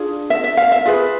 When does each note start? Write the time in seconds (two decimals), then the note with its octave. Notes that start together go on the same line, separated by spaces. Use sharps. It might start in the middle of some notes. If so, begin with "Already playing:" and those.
Already playing: D4 F4 G#4
0.30 E5
0.44 E5
0.57 F5
0.72 E5
0.85 F4 G#4 B4